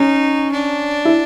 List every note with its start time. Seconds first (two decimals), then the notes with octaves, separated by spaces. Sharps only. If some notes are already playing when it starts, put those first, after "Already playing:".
Already playing: C#4 D#4
0.52 D4
1.05 E4